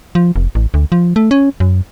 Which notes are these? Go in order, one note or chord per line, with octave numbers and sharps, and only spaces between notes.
F3
F1
A1
D2
F3
A3
C#4
F#2